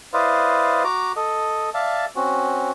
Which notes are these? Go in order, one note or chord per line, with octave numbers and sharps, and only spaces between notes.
E4 B4 C5 D5 D#5 F5
F#4 A#5 D6
A4 D#5
D5 E5 F5 A5
C4 C#4 F#4